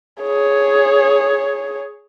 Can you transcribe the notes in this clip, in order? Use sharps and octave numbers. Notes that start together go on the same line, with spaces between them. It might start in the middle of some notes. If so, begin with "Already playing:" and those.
G#4 C#5